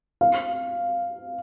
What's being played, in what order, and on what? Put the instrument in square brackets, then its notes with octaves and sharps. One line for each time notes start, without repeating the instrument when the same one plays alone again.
[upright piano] F5